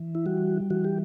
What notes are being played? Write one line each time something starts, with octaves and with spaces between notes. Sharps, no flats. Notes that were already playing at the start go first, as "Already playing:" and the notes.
Already playing: E3
E4
G3 F#4
E3 F#4
G4